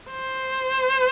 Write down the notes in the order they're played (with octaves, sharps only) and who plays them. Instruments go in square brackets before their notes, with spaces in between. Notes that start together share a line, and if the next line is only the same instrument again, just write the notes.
[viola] C5